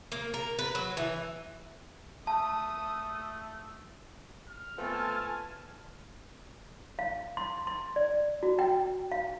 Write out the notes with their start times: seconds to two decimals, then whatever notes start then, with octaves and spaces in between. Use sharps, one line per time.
0.12 A#3
0.34 A#4
0.59 B4
0.75 F#3
0.97 E3
2.27 A3 A5 D#6
4.48 F6
4.78 A3 B3 C4 F4 A4 G#5 A5
6.99 F5
7.37 C6
7.67 C6
7.96 D5
8.43 F#4
8.59 G5
9.12 F5